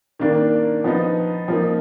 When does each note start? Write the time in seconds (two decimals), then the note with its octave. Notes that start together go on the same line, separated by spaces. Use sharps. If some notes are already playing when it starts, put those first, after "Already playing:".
0.19 D#3 A#3 D4
0.84 F3 B3 D#4
1.48 F3 A#3 D#4